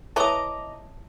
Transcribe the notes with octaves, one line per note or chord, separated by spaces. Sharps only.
E4 B4 C#5 D#5 A5 A#5 D6 D#6